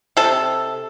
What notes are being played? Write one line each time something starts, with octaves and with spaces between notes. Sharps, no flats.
C3 A4